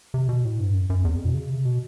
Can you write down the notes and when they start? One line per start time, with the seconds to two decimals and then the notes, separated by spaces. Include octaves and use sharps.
0.14 C3
0.29 B2
0.45 A2
0.60 G2
0.74 F#2
0.90 F#2
1.05 E2
1.14 F2
1.25 B2
1.34 C#3
1.50 C3
1.65 B2